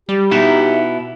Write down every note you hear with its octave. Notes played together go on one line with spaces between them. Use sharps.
G3 G4
B2 B3 D#4 E4 E5